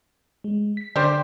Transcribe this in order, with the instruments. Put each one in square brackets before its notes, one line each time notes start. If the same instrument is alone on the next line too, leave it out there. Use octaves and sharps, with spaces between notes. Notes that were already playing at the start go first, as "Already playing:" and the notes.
[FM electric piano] G#3
B6
[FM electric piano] D3 D6 [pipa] G3 G4 C5